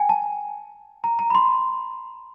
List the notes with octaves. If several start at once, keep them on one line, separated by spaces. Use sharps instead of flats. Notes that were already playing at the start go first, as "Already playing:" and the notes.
Already playing: G5 G#5
A5
A#5
A#5
B5
C6